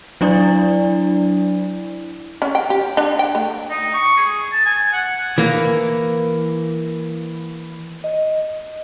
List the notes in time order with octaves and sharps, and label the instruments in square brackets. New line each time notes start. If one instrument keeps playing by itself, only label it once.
[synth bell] F#3 D4 E4 D5
[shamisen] C#4
G5
G4
D4
G5
A3
[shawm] D#4
C#6
G#4
A5
G#5
F#5
[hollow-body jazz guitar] E3 A#3
[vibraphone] D#5